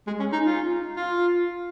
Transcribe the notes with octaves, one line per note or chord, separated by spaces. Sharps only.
G#3
C#4
D#4
F4
F4